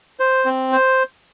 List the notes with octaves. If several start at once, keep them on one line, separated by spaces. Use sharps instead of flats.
C5
C4
C5